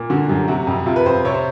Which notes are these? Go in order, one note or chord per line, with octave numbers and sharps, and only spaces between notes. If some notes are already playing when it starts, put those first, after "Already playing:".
Already playing: A#2
D3 F#4
F#2 G4
C3 F#4
F2
C3 F4
B4
F2 C5
C3 C#5
C5